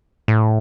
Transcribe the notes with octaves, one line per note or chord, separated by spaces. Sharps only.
A2